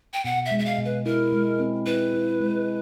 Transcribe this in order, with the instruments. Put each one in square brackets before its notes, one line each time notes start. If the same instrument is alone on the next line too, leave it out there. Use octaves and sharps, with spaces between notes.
[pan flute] G5
[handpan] B2 [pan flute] F#5
[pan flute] E5
[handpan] G#3
[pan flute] E5
F5
[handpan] B2
[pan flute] B4
[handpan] E4 [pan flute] A#4
[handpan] G#3
C4
[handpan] E4 [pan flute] B4
[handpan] E4
G#3